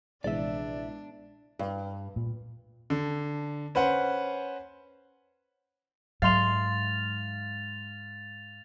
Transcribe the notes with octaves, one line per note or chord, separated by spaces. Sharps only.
A#1 C3 E3 G#3 B3 D4 D5 E5
G2
A#2
D3
C#4 B4 C5 F#5
G#2 F#3 F5 C6 A6 F7